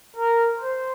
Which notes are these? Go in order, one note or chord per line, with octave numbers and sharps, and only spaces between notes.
A#4
C5